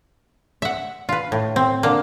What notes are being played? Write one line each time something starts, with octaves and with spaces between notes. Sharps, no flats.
E5 F#5
F4 B4
A2
C4
D3 A#3